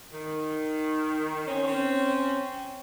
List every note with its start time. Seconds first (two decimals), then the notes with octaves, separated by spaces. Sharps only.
0.12 D#3
1.46 C4 C#4
1.67 C4 C#4